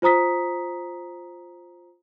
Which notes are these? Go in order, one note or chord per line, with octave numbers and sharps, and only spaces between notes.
F4 C5 A#5 D#6 B6